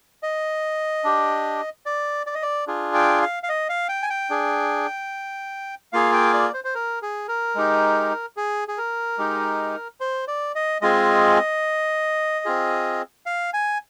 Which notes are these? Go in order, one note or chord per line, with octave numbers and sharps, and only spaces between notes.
D#5
D4 G4
D5
D5
D#5
D5
D4 F4 G#4
G5
F5
F5
D#5
F5
G5
G#5
G5
D4 G#4
A#3 F4 G#4 F5
G5
D5
C5
C5
A#4
G#4
A#4
G#3 D#4 G4
G#4
G#4
A#4
G#3 D#4 G4
C5
D5
D#5
G#3 C4 F4 G#4 D#5
C4 F4 G#4
F5
G#5